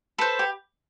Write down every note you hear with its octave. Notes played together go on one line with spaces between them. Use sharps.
A4 B4 C5
G4